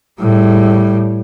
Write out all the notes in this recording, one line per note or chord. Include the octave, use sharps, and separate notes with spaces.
A2 G3